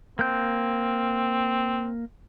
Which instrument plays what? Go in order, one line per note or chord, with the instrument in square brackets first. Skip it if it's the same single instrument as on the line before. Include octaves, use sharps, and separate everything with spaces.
[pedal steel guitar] A#3 G6 [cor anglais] C4